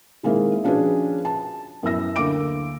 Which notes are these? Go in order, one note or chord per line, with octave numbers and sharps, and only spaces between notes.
D#3 G#3 A#3 C4 E4
F3 C#4 D4 F#4 G#4 B4
A5
F#2 B3 E4 E6 A#6
D2 A#3 D6 D7